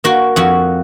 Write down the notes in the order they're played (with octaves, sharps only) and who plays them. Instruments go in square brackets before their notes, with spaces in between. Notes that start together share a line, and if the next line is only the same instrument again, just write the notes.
[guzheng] A#3 F#4
F2 F#4